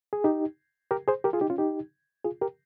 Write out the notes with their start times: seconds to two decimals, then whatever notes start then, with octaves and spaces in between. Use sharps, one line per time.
0.13 G#4
0.24 D#4 G4
0.91 G4 A#4
1.08 G#4 C5
1.24 G4 A#4
1.33 F4 G#4
1.41 D#4 G4
1.50 C#4 F4
1.58 D#4 G4
2.25 F4 G#4
2.41 G4 A#4